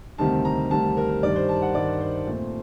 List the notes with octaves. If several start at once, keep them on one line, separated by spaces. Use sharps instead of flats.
D2 C3 D#3 G3 C4 A5
A#5
D2 C3 D#3 G3 C4 A5
A#4
G2 D#3 G3 D5
C5
A5
F#5
G2 D#3 G3 D5
C5
A#2 A3 C4